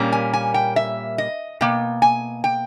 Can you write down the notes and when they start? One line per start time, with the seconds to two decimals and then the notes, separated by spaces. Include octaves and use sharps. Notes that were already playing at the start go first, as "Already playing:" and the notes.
Already playing: A#2 G3 A#3 C#4
0.12 G#5
0.33 G#5
0.54 G5
0.76 E5
1.18 D#5
1.61 B2 A#3 G5
2.02 G#5
2.44 G5